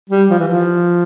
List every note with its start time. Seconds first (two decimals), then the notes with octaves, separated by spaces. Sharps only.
0.10 G3
0.30 F3
0.39 E3
0.48 F3